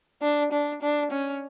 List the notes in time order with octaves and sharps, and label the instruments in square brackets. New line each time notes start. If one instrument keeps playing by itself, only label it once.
[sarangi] D4
D4
D4
C#4